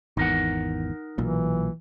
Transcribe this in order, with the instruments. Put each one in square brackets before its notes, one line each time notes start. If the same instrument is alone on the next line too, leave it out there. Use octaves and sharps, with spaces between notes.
[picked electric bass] G#1 E2 [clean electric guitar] D#4 A#4 F#5
[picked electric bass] B1 A#2 [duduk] E3